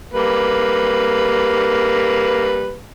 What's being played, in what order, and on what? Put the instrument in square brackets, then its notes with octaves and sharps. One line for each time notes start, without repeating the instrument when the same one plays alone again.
[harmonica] G3 A#3 B4